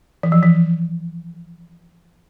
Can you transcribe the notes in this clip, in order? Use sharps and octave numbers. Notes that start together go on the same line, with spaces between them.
E3
F3
E3